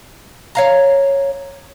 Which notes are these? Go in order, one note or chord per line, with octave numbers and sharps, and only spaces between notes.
C#5 F5 A#5